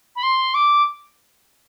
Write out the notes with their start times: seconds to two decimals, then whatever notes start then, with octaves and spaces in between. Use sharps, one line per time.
0.15 B5
0.22 C6
0.54 D6